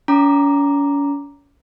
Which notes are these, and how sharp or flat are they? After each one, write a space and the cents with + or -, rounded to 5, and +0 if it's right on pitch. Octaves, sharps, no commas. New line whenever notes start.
C#4 +40 A#5 +0 D6 +0